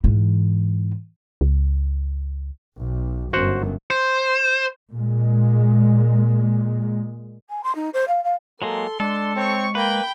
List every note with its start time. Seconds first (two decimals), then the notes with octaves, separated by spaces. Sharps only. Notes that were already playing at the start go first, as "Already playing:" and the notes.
0.04 G#2 E3
1.41 C#2
2.77 B1
3.33 G1 F#2 F#4 C5 F#5
3.90 C5
4.95 A#2 G#3
7.49 G#5
7.63 C6
7.75 D#4
7.93 C5
8.08 F5
8.24 F5
8.62 F#3 G#3 A#3 A4 C6
9.00 G#3 D4 A4
9.36 C4 C#5 C#6
9.75 A#3 B4 G5 B5